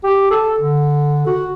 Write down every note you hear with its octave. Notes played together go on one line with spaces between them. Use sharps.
G4
A4
D3
F#4